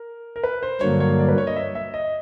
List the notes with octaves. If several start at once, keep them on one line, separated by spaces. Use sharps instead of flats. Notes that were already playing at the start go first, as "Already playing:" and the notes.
Already playing: A#4
A#4
B4
C5
G2 D3 F#3 A#3 C#5
C#5
D5
B4
C#5
D#5
E5
E5
D#5